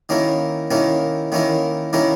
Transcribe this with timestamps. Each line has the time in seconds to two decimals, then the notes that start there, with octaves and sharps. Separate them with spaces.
0.09 D#3 A#3 C#4 E4 A#4
0.71 D#3 A#3 C#4 E4 A#4
1.32 D#3 A#3 C#4 E4 A#4
1.93 D#3 A#3 C#4 E4 A#4